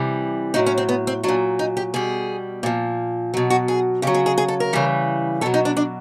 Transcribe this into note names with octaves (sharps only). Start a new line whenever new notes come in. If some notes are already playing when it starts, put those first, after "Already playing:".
Already playing: C3 E3 G3
A2 F#3 D#4
C#4
C4
B3
C4
A#2 F#3 D4
D#4
G4
B2 G3 G#4
A#2 F3
B2 F#3
F#4
G#4
C#3 F#3 G4
G#4
G#4
G#4
A4
A#4
C#3 E3 G3
B2 F#3 A4
D#4
D4
D4